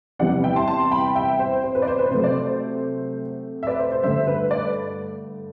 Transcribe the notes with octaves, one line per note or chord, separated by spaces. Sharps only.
E2 C3 E3 G3 B3 D5 F#5
E5 G5
A5 C6
A5 C6
G5 B5
E5 G5
C5
C5
B4
D5
C5
B4
C3 F#3 A3 C5
D5
C5
E5
B4 D5
C5
C5
G2 D3 A3 C5 E5
B4
B4 D5